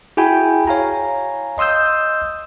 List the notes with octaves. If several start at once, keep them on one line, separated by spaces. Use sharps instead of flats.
E4 F#4 G#4 G5 G#5 B5
C#5 F5 G#5 A#5
D#5 C6 D#6 E6 G6